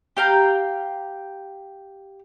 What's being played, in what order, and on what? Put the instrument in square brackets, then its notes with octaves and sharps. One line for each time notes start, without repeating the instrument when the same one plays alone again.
[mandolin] G4 F5 G5 A#5